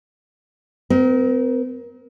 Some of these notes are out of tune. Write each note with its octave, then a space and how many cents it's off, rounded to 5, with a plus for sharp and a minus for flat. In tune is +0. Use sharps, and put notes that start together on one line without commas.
C4 -35 A#4 +20